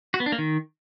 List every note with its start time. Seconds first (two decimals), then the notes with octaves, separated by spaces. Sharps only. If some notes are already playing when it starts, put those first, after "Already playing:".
0.14 F#4
0.20 B3
0.26 D4
0.32 A#3
0.38 D#3